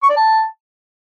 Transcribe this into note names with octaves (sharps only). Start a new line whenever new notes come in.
C#6
D5
A5